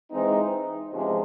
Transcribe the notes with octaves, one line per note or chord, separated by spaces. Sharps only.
E3 G#3 C4 D#4
E2 C3 F3 G#3 C#4